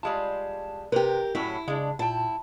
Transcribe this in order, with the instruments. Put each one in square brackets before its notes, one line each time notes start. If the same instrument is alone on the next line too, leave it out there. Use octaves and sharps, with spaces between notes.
[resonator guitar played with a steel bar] G3 G#3 F4 [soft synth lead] A5
[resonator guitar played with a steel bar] C3 [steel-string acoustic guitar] G4 A#4 [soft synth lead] B4
[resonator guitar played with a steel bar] A2 F#3 C#4 [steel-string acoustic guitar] E4 [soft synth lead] B6
[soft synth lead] C#3 [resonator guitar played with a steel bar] G#3 D4
[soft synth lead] A#2 [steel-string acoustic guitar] E4 [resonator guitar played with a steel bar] G5 A5